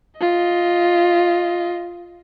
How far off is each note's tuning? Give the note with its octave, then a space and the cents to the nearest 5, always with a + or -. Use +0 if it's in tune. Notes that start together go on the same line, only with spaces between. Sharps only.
F4 +0 D#5 +10